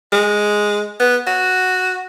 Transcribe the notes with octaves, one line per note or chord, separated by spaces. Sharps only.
G#3
B3
F#4